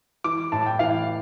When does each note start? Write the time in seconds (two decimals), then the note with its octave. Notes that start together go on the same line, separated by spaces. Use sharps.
0.24 E3 D6
0.52 A2 A5
0.66 G5
0.79 E3 F5